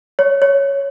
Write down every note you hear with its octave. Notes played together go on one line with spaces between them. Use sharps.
C#5
C#5